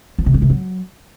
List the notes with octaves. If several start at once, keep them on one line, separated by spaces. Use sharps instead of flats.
F3
C3
G#3
C3
F#3